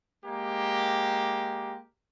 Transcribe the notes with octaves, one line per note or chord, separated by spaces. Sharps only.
G#3 A#3 G4